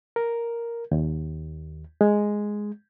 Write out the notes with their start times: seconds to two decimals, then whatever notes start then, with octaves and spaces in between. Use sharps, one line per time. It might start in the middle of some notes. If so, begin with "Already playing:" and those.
0.16 A#4
0.91 D#2
2.01 G#3